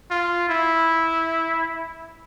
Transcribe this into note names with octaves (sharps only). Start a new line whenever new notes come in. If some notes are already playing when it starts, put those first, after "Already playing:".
F4
E4